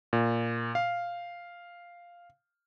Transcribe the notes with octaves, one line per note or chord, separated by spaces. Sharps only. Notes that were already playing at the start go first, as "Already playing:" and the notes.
A#2
F5